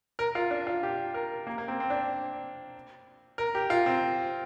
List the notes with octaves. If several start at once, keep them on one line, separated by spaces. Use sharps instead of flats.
A#4
F4
D4
F4
G4
A#4
A#3
A#3
C4
C4
D4
A#4
G4
F4
C4